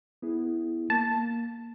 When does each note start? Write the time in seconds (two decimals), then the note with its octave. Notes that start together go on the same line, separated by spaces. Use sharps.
0.22 B3 E4 G#4
0.90 A#3 A5